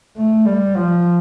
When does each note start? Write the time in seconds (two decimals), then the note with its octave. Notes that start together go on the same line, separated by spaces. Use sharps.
0.18 A3
0.46 G3
0.76 F3